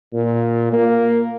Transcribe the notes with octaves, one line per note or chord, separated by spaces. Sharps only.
A#2
A#3